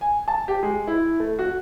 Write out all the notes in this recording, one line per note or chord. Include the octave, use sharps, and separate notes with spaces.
G#5
A5
G4
G#3
E4
A3
F#4